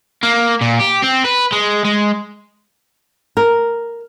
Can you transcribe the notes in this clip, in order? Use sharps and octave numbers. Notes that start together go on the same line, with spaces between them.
A#3
A#2
G4
C4
B4
G#3
G#3
A#4